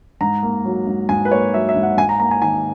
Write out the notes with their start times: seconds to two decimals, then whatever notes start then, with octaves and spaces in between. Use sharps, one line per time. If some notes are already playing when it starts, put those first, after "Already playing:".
0.21 G#2 A#5
0.43 A#3
0.65 F#3
0.87 G#2
1.09 G#2 G#5
1.25 B4
1.31 A#3 C#5
1.54 F#3 E5
1.69 E5
1.75 G#2
1.83 F#5
1.97 G#2 G#5
2.09 A#5
2.20 A#3 A#5
2.31 G#5
2.42 D#3 G#5